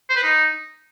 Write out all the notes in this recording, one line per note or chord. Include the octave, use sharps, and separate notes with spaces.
C5
B4
D#4